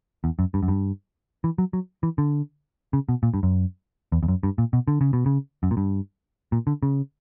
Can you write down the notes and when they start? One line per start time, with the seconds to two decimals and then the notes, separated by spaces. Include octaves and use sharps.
0.24 E2
0.39 F#2
0.54 G2
0.63 F#2
0.68 G2
1.44 E3
1.58 F#3
1.73 F#3
2.03 E3
2.18 D3
2.93 C#3
3.09 B2
3.23 A#2
3.34 G2
3.43 F#2
4.12 E2
4.23 E2
4.28 F#2
4.43 G2
4.58 A#2
4.73 B2
4.88 D3
5.01 C#3
5.13 B2
5.26 C#3
5.63 F#2
5.71 A#2
5.77 G2
6.52 A#2
6.67 D3
6.83 C#3